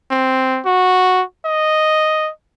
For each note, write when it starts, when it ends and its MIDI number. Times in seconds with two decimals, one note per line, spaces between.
0.11 0.61 60
0.66 1.23 66
1.45 2.30 75